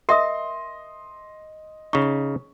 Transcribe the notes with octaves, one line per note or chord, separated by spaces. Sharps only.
A#4 D#5 E5 C6 D#6
C#3 D#4 C#6